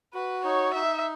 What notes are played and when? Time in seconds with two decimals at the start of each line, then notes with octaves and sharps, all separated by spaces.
0.14 F#4 B4
0.44 D#4 C#5
0.74 D#4 E5